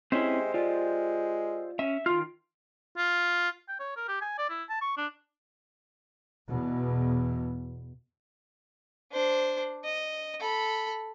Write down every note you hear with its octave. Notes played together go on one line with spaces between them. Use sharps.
G#3 C4 C#4 E4 G4 C5 E5
G#3 F4 D5
C#4 E5
D#3 F4 F6
F4
G5
C#5
A#4
G4
G#5
D5
E4
A5
C#6
D4
E2 B2
D4 C5
D#5
A4 B5